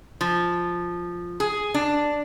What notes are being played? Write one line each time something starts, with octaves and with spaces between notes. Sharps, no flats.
F3
G#4
D4